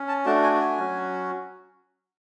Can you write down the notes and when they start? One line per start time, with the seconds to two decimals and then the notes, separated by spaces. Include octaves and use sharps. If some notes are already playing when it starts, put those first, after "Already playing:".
Already playing: C#4
0.08 A5
0.25 A3 D4 F#4 A5
0.43 G#5
0.61 G#5
0.78 F#3 C#4 F#4